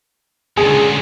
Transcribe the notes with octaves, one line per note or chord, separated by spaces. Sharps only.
C#2 F#2 A#2 D3 G#4